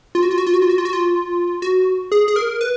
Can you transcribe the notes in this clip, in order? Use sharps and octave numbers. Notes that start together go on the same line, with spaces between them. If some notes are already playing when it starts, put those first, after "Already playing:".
F4
F#4
F4
F#4
F4
F#4
F4
F#4
F4
F#4
F4
F#4
G#4
G#4
A#4
B4